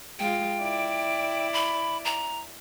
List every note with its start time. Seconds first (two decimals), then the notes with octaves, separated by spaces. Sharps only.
0.19 G#3 F4 G5
0.61 E4 D5
1.53 B5
2.05 A#5